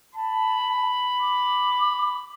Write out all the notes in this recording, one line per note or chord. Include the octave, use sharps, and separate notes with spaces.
A5 B5
D6